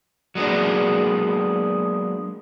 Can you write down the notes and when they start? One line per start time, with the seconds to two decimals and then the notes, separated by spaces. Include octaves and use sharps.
0.35 F#3 G#3 A#3 B3 D4